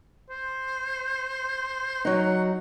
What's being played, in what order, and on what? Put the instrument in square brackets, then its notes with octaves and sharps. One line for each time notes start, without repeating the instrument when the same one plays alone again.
[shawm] C5
[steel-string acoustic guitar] F#3 D#4 [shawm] F#5